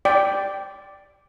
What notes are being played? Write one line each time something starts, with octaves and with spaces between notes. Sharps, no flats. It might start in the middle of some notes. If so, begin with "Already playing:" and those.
D5 G5